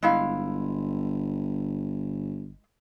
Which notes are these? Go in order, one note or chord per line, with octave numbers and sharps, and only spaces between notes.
G1 G#3 E4 F5